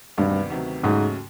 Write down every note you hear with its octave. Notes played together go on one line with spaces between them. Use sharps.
D2 G2 C3 D#3 F#3 B3
D2 C3 D#3 F#3 B3
D#2 G#2 C#3 F#3 A3 C#4